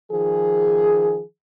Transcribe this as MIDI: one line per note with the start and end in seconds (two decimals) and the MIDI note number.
0.12 1.21 51
0.12 1.21 53
0.12 1.21 68